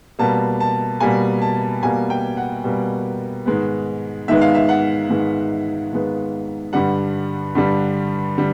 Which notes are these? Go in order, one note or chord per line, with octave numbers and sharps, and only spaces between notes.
B2 G3 A#3 A5
A5
B2 G3 A#3 G#5
A5
B2 G3 A#3 G#5
G5
F#5
B2 G3 A#3
G#2 D#3 G#3 B3
G#2 D#3 G#3 B3 E5
F5
E5
F#5
G#2 D#3 G#3 B3
G#2 D#3 G#3 B3
G2 D3 G3 F#5
G2 D3 G3
D3 G3